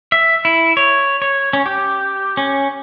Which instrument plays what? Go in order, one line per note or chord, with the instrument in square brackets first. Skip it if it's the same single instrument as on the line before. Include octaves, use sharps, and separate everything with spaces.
[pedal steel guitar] E5
E4
C#5
C#5
C#4
G4
C#4